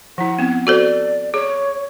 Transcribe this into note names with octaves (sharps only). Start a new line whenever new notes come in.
F3 E4 F#5
B3 C4
F#4 A4 C5 D5
G#4 C#5